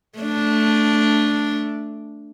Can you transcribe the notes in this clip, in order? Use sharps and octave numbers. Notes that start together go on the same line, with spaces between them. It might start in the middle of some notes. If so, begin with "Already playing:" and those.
A3 D4